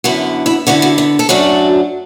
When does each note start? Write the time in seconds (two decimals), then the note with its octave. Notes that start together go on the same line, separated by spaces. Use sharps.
0.04 F#2 D3 B3 E4 F#4
0.46 E4
0.67 D3 B3 E4 F#4
0.82 F#4
0.98 E4
1.19 A4
1.29 F#2 F#3 A3 D4 F#4